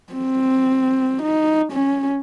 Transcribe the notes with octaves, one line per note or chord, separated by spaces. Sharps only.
C4
D#4
C#4